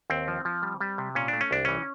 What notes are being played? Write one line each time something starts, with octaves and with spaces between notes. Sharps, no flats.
D#2 C4
F3
F3
G3
G3
C3
A#2 C#4
A3 D4
C#4
C2 D4
E3 C#4